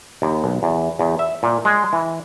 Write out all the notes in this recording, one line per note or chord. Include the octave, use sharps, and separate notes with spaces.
D#2
B1
E2
E2
E5
A#2
G#3
E3